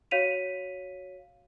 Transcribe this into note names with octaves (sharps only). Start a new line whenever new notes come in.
F#4 C#5 F5 B6 D#7 F7